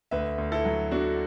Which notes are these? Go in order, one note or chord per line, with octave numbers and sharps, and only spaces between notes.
D2 B4 E5
D2
E4 A4
F#3
D3 D4 F#4